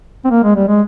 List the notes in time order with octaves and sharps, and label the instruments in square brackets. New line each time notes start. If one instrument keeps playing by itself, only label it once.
[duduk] C4
A#3
G#3
G3
G#3